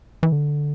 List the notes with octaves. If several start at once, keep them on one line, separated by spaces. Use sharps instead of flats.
E3
D3